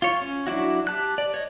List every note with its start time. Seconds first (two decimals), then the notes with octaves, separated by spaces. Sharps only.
0.02 F4 C#5
0.22 C#4
0.47 F#3 D4 E4 F#4
0.87 G4 A5 F#6
1.18 D5
1.34 C#5 D#5